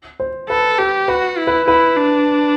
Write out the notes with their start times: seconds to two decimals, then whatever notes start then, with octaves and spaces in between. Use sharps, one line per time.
0.20 C5
0.49 A4 B4
0.79 G4 B4
1.08 F#4 B4
1.38 E4
1.47 B4
1.67 E4 B4
1.97 D4